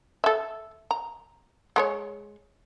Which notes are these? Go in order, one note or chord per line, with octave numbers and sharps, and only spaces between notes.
A4 E5
A#5
G#3 A#4 C#5